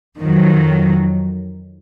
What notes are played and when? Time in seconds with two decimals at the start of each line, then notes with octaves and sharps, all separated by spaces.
0.19 F2 D#3 F#3